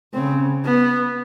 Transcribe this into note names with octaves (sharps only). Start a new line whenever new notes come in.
C#3 C4
B3